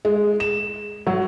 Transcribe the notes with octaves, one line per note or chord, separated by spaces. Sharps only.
G#3
E7
F#3